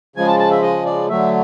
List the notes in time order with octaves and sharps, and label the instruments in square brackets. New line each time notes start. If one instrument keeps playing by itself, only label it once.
[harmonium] C#3 F3 G#3 G#5
A5
A5
E5
D#5
D5
D3 F#3 A3 E5